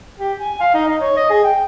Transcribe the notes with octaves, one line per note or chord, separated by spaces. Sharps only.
G4
G#5
F5
D#4
D#4
C#5
D#5
G#4
G5